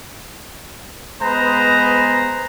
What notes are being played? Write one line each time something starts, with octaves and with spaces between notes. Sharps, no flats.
G#3 B3 B4 C5 A#5